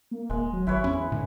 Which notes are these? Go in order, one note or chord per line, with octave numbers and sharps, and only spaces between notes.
A#3
D#1 G#3
F#3
G#1 E4 B4 C#5
E2 C#4
A2 D3